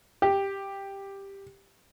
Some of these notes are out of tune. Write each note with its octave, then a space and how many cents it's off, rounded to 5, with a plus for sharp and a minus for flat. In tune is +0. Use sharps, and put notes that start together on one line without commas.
G4 +5